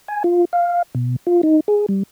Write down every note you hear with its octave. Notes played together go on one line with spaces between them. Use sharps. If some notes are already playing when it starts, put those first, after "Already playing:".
G#5
F4
F5
B2
F4
D#4
G#4
G3